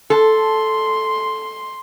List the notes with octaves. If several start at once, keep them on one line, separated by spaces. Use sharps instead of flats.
A4 C6